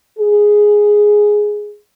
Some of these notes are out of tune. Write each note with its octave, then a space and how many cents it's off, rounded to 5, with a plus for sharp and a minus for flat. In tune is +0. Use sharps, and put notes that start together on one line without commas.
G#4 +0